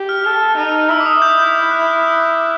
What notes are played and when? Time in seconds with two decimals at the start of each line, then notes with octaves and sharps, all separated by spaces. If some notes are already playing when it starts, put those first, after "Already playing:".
Already playing: G4
0.09 F6
0.25 A4 F6
0.57 D#4
0.90 E4 E6
1.00 D6
1.06 D#6
1.22 G6
1.39 G6
1.55 G6
1.71 F#6
1.87 F6
2.03 E6
2.20 D6